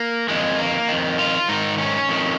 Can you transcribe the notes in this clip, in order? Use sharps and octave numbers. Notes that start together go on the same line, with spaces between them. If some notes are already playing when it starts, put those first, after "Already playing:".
Already playing: A#3
F2 D#3 G#3
A#3
F2 D#3
F4
G#2 D#3 D#4
C#4
F2 D#3